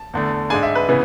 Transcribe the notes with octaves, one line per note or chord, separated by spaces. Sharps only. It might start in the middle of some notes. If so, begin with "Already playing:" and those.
Already playing: A5
E2 D3 A3
G#2 G#3 D4 G#5
E5
B4
C#3 E3 B3